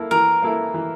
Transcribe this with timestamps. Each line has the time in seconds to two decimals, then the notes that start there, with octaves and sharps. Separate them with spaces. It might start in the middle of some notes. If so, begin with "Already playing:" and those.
Already playing: A#3 E4 A4
0.11 E3 A#4
0.43 A#3 E4 A4
0.74 E3